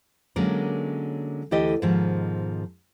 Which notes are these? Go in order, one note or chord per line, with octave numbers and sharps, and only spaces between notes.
D3 F#3 G#3 A#3 C#4 A#4
D2 E3 E4 G4 A4 D#5
G#2 B2 D#3 F3